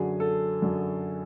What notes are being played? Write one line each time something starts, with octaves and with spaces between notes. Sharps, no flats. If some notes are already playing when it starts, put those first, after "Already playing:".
Already playing: F#2 D3 F#3 G#4
A4
F#2 D3 F#3